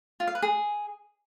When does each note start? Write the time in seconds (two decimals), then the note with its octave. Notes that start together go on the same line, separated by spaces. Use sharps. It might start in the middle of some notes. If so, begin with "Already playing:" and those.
0.20 F4
0.27 F5
0.35 B4
0.42 G#4